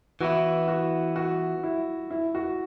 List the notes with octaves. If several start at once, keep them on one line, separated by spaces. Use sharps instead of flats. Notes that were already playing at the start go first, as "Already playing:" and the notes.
E3 B3 E4 F#4
F#4
F#4
E4
E4
F#4